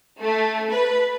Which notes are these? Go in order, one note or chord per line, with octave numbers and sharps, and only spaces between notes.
A3
B4